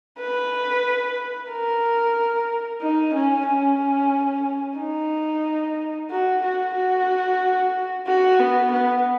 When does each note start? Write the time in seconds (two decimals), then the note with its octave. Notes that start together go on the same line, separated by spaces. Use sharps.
0.19 B4
1.51 A#4
2.81 D#4
3.15 C#4
3.47 C#4
4.78 D#4
6.10 F#4
6.43 F#4
6.75 F#4
8.07 F#4
8.40 B3
8.72 B3